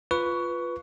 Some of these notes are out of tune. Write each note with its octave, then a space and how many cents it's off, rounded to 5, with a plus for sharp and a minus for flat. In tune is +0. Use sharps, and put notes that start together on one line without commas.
F4 +0 B4 +0 C#6 +20